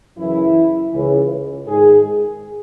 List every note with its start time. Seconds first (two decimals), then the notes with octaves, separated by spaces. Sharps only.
0.17 F#2 C#3 E3 E4
0.91 C#2 C#3 E3
1.67 G#2 D#3 G#4